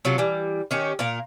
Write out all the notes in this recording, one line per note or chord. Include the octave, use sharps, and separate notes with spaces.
C3 F#3 F4
E3 G3
D#3 C#4 G4
A#2 A#4 F5